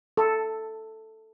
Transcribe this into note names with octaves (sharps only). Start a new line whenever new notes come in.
A4